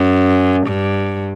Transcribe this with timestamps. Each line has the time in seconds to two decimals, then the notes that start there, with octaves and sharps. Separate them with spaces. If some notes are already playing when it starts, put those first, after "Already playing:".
Already playing: F#2
0.67 G2